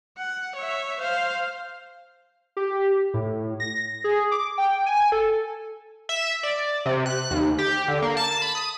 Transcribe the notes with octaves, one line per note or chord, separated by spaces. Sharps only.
F#5
C#5 E5
C5 F5
G4
A2
A#6
G#4
D6
G5
G#5
A4
E5
D5
C3
F#6
D#2
G4
D3
A#3
A5
B5
D#6